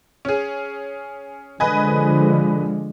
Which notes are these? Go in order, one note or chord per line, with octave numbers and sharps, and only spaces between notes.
C#4 G#4
D3 F3 G#3 B4 D#5 G#5